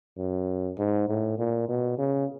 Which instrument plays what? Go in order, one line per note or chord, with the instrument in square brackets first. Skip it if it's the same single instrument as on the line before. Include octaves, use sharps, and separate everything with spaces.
[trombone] F#2
G#2
A2
A#2
B2
C#3